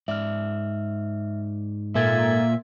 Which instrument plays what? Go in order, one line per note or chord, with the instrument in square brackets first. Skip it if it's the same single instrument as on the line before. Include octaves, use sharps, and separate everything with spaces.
[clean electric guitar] G#2 D5 [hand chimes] E5 F6
[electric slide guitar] A#2 A#3 [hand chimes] A4 G#6 A6 [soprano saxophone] E5